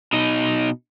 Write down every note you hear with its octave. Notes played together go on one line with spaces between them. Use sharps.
B2 D#4